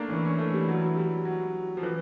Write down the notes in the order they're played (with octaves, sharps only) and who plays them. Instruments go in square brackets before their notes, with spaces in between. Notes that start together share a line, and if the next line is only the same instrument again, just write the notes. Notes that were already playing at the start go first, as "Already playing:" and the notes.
Already playing: [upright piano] A3 A#3 D4
[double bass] E3 [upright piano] C#4
[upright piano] C#4
A3
G3
F#3
G3
F#3
F3
E3